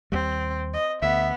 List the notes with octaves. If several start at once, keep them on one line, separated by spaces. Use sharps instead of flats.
D#2 G3 C4
D#5
D2 B3 E5